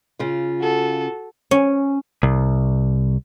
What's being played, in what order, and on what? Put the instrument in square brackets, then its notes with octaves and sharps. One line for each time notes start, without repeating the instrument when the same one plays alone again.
[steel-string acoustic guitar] C#3 F4
[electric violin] F#4 A4
[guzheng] C#4
[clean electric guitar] C2